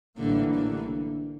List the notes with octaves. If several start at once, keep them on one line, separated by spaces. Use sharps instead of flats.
A1 A2 D3 E3 G3 A#3
D3